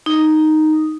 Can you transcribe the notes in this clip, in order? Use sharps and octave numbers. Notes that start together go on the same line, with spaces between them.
D#4